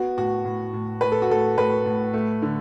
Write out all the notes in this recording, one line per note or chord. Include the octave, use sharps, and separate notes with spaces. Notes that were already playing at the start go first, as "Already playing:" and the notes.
Already playing: B3 F#4
A2 F#4
A2
A2
A2 B4
A4
F#4
A2 A4
A2 B4
A2
A3
D3